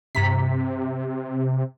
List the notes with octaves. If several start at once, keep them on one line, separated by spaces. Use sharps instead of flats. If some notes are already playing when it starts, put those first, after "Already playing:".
G2 C3 A#5 B6